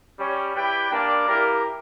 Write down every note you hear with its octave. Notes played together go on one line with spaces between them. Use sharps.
G3 C#4 G4 C#5
E4 G4 B4 D5 G5
G3 A#3 D4 A#4 D5
A#3 E4 G4 A#4